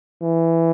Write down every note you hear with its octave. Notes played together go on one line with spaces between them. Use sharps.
E3